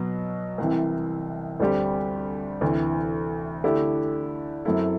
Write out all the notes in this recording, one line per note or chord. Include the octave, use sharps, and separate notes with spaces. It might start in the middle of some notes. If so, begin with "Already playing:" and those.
Already playing: B2 F#3 B3
C2 C3 E3
D2 D3 G3 C4 G4
D2 C3 E3
D3 A3 E4 G4
F#2 F#3 C4 E4 A4